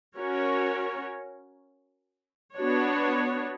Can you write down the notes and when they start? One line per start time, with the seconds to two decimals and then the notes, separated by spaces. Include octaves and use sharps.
0.18 C#4 F#4 A#4 C#5
2.56 B3 D4 F#4 C#5